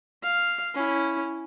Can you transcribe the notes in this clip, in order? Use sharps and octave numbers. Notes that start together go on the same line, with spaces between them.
F5
C#4 E4